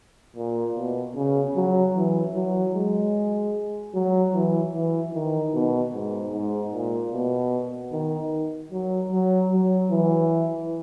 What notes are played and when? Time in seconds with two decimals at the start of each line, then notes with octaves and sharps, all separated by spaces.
0.36 A#2
0.76 B2
1.16 C#3
1.55 F#3
1.95 E3
2.35 F#3
2.75 G#3
3.94 F#3
4.34 E3
4.74 E3
5.14 D#3
5.54 B2
5.93 G#2
6.33 G#2
6.73 A#2
7.13 B2
7.92 D#3
8.72 F#3
9.12 F#3
9.52 F#3
9.91 E3